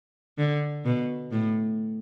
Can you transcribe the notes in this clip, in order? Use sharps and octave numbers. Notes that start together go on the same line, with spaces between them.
D3
B2
A2